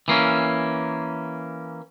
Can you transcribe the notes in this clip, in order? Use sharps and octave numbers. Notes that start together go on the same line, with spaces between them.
E3 A#3 C#4